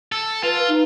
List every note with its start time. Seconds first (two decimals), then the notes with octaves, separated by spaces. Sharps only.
0.12 A4
0.43 F4 B4
0.68 D#4